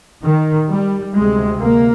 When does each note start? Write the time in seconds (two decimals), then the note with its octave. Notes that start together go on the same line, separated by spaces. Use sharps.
0.24 D#3
0.69 G3
1.15 D2 C3 G#3
1.61 A#3